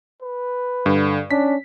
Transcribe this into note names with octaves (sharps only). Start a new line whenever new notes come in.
B4
G2 D3
C#4 D4 B6